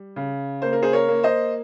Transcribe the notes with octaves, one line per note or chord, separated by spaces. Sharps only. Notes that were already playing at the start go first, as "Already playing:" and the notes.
Already playing: G3
C#3
A#3 C5
A#4
G#4 C5
A#4 C#5
A#3
C5 D#5